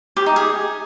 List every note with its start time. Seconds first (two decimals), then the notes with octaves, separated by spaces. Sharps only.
0.17 G4
0.26 D#4
0.36 G#4